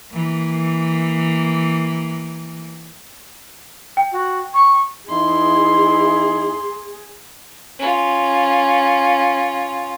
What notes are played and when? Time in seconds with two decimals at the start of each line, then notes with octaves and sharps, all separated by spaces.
0.13 E3 A#3
3.97 G5
4.12 F#4
4.54 C#6
5.09 E2 D#4 E4 G#4 C6
7.78 C#4 F4